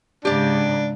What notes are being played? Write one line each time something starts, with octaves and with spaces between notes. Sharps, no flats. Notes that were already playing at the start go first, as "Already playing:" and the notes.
G#2 C#3 D4 G4 D5